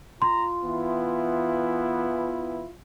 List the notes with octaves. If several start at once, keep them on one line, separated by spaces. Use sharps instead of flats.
F4 A#5 C6
E3 B3 E4